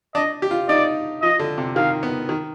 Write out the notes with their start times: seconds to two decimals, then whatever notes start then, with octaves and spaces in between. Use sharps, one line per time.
0.15 D4 D#5
0.42 G4
0.51 F4
0.69 D#4 D5
1.22 F3 D#5
1.39 D3
1.58 C3
1.76 D#3 F5
2.03 B3
2.29 D#3